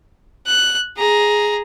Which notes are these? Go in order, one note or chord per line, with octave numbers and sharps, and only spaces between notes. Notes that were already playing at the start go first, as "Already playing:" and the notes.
F#6
G#4 A#5